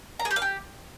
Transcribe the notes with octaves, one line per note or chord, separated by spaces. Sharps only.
A#5
G#4
G4
F5
G4